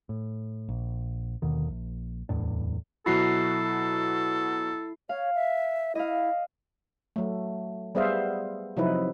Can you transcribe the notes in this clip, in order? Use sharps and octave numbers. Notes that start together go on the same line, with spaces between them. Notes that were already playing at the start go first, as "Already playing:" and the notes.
A2
A#1
D#2 B2 D3 D#3
A#1
D1 E2 A2 D4
B2 F#3 E4 F#4 A4 C7
C#5 F5
E5
E4 D#5 F5
F#3 A3
G3 B3 G#4 C5 E5 F5
C3 F3 F#3 D#4 E4 B4